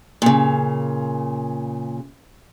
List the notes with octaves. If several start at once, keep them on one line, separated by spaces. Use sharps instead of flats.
A#2 C#3